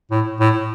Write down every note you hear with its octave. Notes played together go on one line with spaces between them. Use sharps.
A2
A2